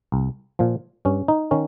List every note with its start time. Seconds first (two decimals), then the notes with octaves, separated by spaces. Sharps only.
0.12 C2
0.59 A#2 F3
1.05 G2 C#4
1.28 D#4
1.51 D#3 C#4